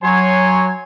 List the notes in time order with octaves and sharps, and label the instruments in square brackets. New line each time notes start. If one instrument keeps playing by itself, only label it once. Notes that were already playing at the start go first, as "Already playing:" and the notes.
[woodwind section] F#3 [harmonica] C#5 G#5 C6